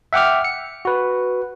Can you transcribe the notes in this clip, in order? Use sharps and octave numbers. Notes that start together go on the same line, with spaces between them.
E5 F#5 G5 D6 F6
C#7
F#4 B4